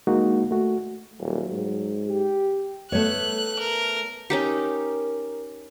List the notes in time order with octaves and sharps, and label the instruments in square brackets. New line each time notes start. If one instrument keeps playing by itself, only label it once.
[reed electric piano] G#3 A#3 D#4 F#4
A3 F#4
[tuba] D#1 [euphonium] F#3
[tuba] G#2
[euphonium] G4
[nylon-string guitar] A3 B3 C#5 [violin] F#6
[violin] A#4
[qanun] C#4 D#4 G4 [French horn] A#4